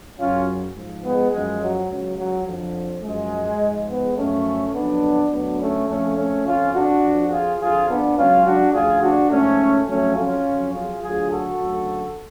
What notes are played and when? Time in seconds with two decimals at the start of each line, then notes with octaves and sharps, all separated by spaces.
0.18 F#2 C#3 F#3 C#4 F4
0.75 G#2 F3
1.04 G#3 B3
1.32 F#2 F3 G#3
1.61 F#3
1.90 C#2 C#3 F#3
2.18 F#3
2.47 F2 D3 F3
3.04 F#2 F3 G#3
3.61 G#2 F3
3.89 G#3 B3
4.18 F#2 F3 A3 C#4
4.74 F2 D3 F#3 B3 D4
5.32 D2 D3 F#3 B3 D4
5.60 A3 C#4
5.88 F2 C#3 F3 A3 C#4
6.17 A3 C#4
6.46 F2 F3 C#4 F4
6.74 D4 F#4
7.03 F2 F3
7.31 F4 G#4
7.59 F2 D3 F3 F4 G#4
7.88 B3 D4
8.17 C#2 C#3 F#3 C#4 F4
8.46 D4 F#4
8.74 D2 C#3 F3 F4 G#4
9.02 D4 F#4
9.31 G#2 F3 A3 C#4
9.88 F2 C#3 F#3 A3 C#4
10.17 C#4 F4
10.46 F2 C#3 F#3
10.74 F4 G#4
11.03 D2 D3 F#3 F4 G#4
11.31 F#4 A4
11.59 D2 C#3 F#3